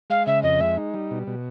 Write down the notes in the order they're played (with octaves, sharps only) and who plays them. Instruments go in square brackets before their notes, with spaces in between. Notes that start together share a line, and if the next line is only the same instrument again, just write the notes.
[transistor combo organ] G#3 [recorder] F5
[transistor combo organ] C#3 [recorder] E5
[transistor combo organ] F2 [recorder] D#5
[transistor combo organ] G#3 [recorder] E5
[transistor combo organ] D#4
G3
B2
B2